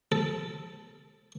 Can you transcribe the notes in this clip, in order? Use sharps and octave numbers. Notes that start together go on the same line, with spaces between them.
A4